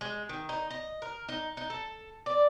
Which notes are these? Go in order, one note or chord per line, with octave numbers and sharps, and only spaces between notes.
G#3
D#3
D#4
D#5
A#4
D#4
D#4
A4
D5